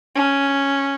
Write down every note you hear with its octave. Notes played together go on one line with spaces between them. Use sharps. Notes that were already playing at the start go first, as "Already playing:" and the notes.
C#4